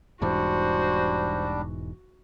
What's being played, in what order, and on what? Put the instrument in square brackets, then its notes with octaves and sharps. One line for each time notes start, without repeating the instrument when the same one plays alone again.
[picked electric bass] E1 G#2 E3 [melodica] G3 D4 [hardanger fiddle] F#4 [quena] C5